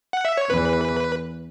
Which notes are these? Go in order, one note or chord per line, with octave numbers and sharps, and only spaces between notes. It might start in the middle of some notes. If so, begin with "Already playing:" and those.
F#5
E5
C#5
E2 E3 B4